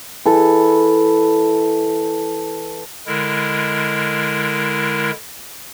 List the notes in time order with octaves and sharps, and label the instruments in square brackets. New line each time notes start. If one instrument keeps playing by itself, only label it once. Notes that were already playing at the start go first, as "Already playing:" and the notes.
[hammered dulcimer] E3 A4
[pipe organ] D3 G#3 E4 A#4